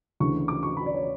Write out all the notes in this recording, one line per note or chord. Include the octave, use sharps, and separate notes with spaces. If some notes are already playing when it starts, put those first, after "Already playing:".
D2 C#3 E3 C#6
D6
C#6
B5
D5
C#5